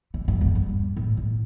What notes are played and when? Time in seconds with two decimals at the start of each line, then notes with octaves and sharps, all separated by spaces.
0.14 D3
0.28 G2
0.41 E2
0.55 G2
0.97 A2
1.17 A2